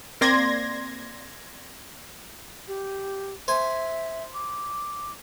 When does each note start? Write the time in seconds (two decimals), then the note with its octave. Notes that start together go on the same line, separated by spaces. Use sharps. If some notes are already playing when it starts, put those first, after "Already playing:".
0.21 A#3 C4 D5 C6 G#6 A#6
2.68 G4
3.48 C5 E5 G#5
4.34 D6